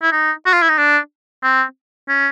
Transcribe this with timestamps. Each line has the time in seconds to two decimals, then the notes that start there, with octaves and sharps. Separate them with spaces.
0.02 E4
0.12 D#4
0.46 F#4
0.53 F4
0.62 E4
0.69 D#4
0.78 D4
1.43 C4
2.09 C#4